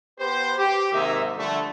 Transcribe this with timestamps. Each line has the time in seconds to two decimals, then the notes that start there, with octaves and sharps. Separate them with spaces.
0.19 B3 G4 B4 C5
0.57 G4
0.93 G#2 C3 D#3 A#3 D#4 E5
1.36 D3 F3 G3 A3